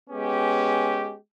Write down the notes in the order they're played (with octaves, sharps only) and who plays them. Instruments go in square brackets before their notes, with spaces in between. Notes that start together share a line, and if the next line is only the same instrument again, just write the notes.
[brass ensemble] G#3 B3 C#4 G4